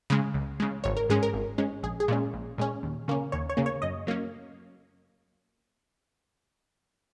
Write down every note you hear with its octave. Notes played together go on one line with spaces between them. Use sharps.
C#3 G#3
C#2
C#3 G#3
G#1 C#5
A#4
G#2 G#3 C#4 G#4
A#4
G#1
G#2 G#3 C#4
A#1 G#4
G#4
A#2 G#3 C#4
A#1
A#2 G#3 C#4
D#2
C#3 A#3 C#4
D#2 C#5
C#5
C#3 A#3 C#4
C#5
F#2 D#5
F#3 A#3 C#4